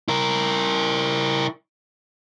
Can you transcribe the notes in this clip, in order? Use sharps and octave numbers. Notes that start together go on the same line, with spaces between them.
E4 A#4